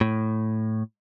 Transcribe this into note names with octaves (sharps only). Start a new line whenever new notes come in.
A2